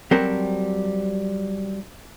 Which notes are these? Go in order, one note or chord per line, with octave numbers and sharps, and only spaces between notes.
F#3 G3 C4 A4 A#4 C5